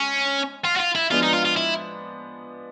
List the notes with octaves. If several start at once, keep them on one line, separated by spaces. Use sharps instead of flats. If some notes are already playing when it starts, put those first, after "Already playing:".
Already playing: G#3 C#4
F4
F#4
F4
E4
F3 G#3 B3 D4 F4
D#4
F4
F4
E4